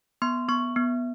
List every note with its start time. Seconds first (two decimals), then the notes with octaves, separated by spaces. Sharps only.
0.22 B3 C6
0.48 B3 C#6
0.76 B3